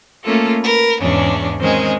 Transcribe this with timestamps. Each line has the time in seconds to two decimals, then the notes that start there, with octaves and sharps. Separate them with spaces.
0.24 A3 A#3 C#4 F4 A4
0.64 A#4 B4
1.00 E2 G#2 C#3 C#4 D4
1.60 D#3 G#3 C4 C#4 G#4 C5